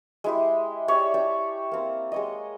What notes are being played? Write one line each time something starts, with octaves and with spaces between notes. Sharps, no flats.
G#3 E4 G4
G4 C#5 D5 E5
E5 G5 A5
A#3 C4
G#3 C#5 D#5